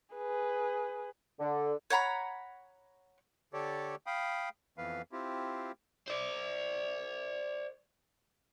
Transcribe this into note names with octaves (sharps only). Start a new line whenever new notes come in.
G#4 B4
D3
C#5 F#5 A#5 B5
D3 G4 A4 C#5 D5
F5 G5 B5 D#6
F2 E3 B3 B4 F5
C4 E4 F4 G4
C5 D5